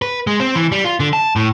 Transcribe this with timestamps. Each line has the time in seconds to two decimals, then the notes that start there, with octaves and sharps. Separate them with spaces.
0.02 B4
0.27 G#3
0.40 C4
0.55 E3
0.72 G3
0.85 F4
1.00 D3
1.13 A5
1.36 A2